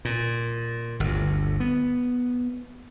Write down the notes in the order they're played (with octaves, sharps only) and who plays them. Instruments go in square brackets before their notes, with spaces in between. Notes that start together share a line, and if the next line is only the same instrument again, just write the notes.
[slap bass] A#2
G1 D2
B3